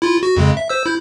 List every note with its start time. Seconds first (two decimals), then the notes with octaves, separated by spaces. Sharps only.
0.02 E4 F4
0.23 F#4
0.37 F2 C#3 G#3
0.57 E5
0.69 C5 E6
0.86 E4 G6